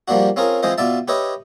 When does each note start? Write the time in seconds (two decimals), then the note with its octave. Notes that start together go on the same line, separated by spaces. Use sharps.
0.08 F3 G3 A#3 D4 F#4
0.36 C4 C#4 F4 G#4 A#4
0.63 E3 G#3 C4 F4 C5 D#5
0.78 B2 F4 D5 E5 A5
1.08 G4 B4 C#5 D#5 E5